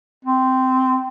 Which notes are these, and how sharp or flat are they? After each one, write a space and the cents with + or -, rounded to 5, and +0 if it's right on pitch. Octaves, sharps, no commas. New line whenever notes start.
C4 -10